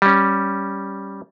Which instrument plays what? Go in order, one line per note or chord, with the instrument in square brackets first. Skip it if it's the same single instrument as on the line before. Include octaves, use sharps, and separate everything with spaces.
[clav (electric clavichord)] G3 C#4